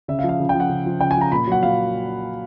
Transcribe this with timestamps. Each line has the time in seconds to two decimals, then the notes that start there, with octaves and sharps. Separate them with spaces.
0.08 C#3 E5
0.19 F5
0.24 F3
0.29 F5
0.40 C#3
0.49 F3 G5
0.60 F#5
0.69 C#3
0.86 F3
1.00 C#3 G5
1.11 G#5
1.17 F3 A#5
1.32 A#2 B5
1.47 F#3 F#5
1.63 A#2 F5